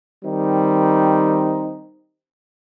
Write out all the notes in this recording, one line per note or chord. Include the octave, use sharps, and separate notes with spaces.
D#3 G3 C4 D#4